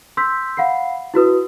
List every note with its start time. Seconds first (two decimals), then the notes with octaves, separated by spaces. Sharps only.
0.17 C6 E6 G6 B6
0.57 F5 F#5 B5 C7
1.14 E4 F#4 B4 D#6